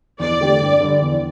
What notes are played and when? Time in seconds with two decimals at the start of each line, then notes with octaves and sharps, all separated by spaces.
0.19 E2 D5
0.40 D3 A3 C4 G4
0.61 G2
0.81 D3 G3
1.01 E2